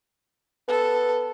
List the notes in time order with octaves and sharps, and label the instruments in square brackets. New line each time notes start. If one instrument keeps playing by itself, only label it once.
[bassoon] B3 [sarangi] A4